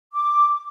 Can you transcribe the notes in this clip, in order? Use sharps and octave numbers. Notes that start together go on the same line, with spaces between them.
D6